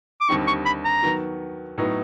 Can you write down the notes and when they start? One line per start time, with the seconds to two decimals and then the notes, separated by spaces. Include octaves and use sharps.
0.21 D6
0.29 D#2 D3 G3 C4 D#4 C#6
0.47 C#6
0.66 B5
0.85 A#5
1.03 D#3 F#3 B3
1.78 A2 F#3 B3 D#4